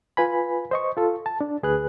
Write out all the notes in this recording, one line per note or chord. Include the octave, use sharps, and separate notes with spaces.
F4 B4 G#5 B5
C5 D#5 C#6
F4 A4
A5
D4
D2 G#4 B4 F#6